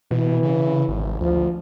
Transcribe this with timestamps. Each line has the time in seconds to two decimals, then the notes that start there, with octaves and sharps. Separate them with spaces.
0.11 B2 E3
0.43 C#3
0.88 G#1
1.21 D2 F3